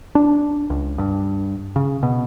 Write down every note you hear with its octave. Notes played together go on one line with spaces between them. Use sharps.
D4
C#2
G2
C#3
B2